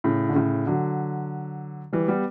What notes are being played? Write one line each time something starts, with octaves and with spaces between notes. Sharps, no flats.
A2 C#3
D3
A2 C#3
D3 F#3
E3 G3
G3 B3